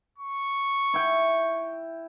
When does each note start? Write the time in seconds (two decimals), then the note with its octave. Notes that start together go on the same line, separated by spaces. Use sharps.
0.18 C#6
0.94 E4 G5